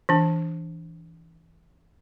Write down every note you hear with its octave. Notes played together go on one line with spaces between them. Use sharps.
E3 D4